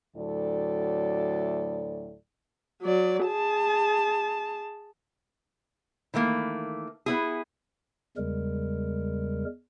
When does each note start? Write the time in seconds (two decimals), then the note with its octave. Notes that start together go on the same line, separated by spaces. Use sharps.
0.17 D2 A2 F#3 A4 D5
2.82 F#3 D5
3.25 G#4 A5
6.14 D#3 E3 A3 A#3
7.06 B3 E4 G#4
8.17 E2 C#3 G3 G#3 A#4